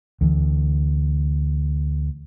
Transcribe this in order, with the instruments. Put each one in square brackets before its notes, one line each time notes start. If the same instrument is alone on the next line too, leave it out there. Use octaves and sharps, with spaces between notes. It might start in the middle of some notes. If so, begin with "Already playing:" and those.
[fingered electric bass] D2 E3